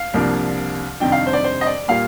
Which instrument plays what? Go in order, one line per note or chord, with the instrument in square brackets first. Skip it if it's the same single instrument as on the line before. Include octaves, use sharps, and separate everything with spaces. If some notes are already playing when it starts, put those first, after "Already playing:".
Already playing: [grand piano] F5
C2 C3 F3 A#3 D4
F2 C3 D#3 G3 D4 G5
F5
C5
D5
C5
D#5
D5
A#2 G3 A#3 F5